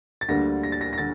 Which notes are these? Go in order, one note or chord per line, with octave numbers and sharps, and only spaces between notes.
A6
D2 D3 G3 A#3 A#6
A#6
A6
A#6
A#6
D3 A6